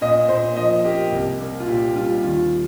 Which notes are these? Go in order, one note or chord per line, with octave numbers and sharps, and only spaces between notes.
A#2 D#5
A#2 C5
F3 D#5
A#3 G4
C2
A#3
F4
A#2 G4
G3 F4
D#2 F4